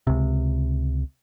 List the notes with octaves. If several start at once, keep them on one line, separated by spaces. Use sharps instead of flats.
C#2 C3